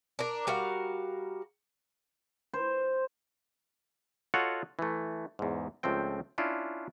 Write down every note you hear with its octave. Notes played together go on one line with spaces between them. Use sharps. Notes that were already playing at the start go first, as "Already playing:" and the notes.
D4 A#4
G3 F#4 A#4 F5
C5
F4 F#4 A4 C#5 D#5 F#5
E3 A3
E2 G#2
C#2 F3 A3 C4 G5
C#4 D4 E4 F4